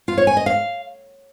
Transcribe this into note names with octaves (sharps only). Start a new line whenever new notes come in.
F4
C#5
G#5
D#5
F5